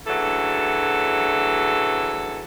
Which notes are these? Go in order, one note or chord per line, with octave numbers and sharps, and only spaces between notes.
D2 C#3 E3 F#3 A4